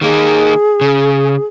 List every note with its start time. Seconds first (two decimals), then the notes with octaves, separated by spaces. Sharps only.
0.01 D#3 A#3 D#4 G#4
0.81 C#3